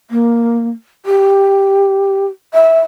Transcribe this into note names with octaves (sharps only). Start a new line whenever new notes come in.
A#3
G4
E5